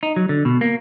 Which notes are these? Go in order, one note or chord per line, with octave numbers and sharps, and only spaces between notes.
D#4
F#3
D3
B2
A#3